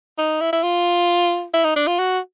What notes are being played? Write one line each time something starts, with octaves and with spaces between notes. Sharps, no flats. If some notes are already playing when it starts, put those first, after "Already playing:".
D#4
E4
E4
F4
E4
D#4
D4
F4
F#4